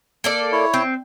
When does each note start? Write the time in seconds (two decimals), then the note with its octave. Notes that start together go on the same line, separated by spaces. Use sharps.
0.24 A#3 A4 D5
0.52 E4 C#5
0.74 C4